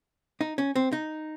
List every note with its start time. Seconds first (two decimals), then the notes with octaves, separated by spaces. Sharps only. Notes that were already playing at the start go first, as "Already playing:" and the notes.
0.41 D#4
0.58 C#4
0.76 C4
0.93 D#4